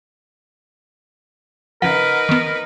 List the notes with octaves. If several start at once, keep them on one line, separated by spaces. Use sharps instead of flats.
C#3 F3 D#4 A#4 B4 F#5
D#3 B3